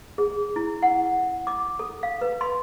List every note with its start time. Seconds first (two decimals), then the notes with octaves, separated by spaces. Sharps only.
0.18 G#4
0.56 E4
0.83 F#5
1.47 D6
1.79 A4
2.03 F5
2.21 B4
2.41 C6